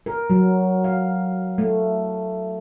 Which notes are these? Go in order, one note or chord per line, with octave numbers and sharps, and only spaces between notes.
A#4
F#3
F5
A3